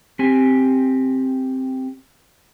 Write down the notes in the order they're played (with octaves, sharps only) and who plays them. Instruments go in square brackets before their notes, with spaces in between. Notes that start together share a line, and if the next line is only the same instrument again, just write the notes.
[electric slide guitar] C4 G4 G#5